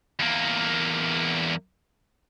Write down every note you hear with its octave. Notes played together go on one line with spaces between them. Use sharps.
E2 A#3